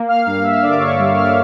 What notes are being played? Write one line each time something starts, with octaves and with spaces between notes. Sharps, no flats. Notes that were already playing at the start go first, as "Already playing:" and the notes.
Already playing: A#3
F5 F6
G2 F5 F6
E5 E6
D3 D5 D6
C#5 C#6
G3
F5 F6